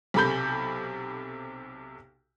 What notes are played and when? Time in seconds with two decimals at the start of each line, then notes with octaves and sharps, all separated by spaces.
0.14 B1 C3 A4 B5 G6